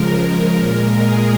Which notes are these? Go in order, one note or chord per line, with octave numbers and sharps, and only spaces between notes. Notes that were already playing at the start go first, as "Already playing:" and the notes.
Already playing: C#3 F3 G#3 A#4
A#2 G#3 A#4
G#4